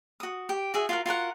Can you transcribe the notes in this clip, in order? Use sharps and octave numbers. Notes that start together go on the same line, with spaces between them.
F#4 D#6
G4
F#4 G#4 E5
F4 F#4 A#4
F4 F#4 A#4 F#5